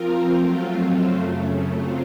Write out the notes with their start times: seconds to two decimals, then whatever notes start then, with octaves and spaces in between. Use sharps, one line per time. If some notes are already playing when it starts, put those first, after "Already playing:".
Already playing: F3 C4 F4 A#4
0.32 F#3 A3 C4 F4
1.02 F#2 C#3 A3
1.73 F#3 C4 F4